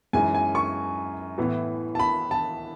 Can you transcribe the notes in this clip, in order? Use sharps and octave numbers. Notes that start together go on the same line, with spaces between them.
F#2 E3 G#3 D#4 G#5
G#5
C#6
A2 E3 B3
A5
B5
A5